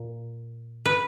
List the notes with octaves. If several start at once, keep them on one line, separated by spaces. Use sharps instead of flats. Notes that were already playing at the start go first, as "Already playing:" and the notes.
Already playing: A#2
B4